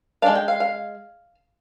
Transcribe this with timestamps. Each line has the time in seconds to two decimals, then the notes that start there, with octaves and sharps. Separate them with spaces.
0.22 G#3 D4 F5
0.35 G5
0.48 F5
0.60 F5